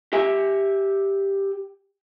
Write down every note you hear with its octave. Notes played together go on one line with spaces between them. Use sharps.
G4 E5 G#5